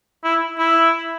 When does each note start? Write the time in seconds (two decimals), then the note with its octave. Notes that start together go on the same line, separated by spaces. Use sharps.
0.24 E4
0.58 E4